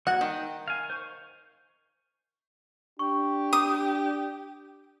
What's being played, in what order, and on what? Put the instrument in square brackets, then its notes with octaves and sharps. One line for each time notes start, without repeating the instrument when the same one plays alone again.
[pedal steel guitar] G3 A#3 F#4 [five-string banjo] F#5
[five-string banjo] D#3 [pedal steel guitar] G5
[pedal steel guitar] F5 G#5
C5 C#6
[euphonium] D4 [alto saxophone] G4 [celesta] C#6
[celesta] D6 [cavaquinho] D#6